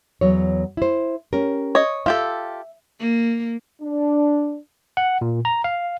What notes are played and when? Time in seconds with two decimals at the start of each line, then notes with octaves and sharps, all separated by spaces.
0.21 E2 F#3 C#5
0.77 E4 C5
1.33 C#4 G4 A#4
1.75 C#5 D#5
2.06 F4 G4 A4 E5
3.00 A#3
3.81 D4
4.97 F#5
5.21 A#2
5.45 A#5
5.64 F5